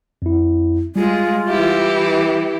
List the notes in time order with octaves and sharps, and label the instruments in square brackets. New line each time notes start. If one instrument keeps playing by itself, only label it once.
[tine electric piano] F2 E4
[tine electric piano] G3 [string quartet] G#3 G#4 [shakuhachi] F4
[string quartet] E3 E4 G4